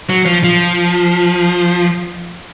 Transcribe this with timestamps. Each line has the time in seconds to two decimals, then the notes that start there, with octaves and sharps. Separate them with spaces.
0.09 F#3
0.26 F3
0.44 F3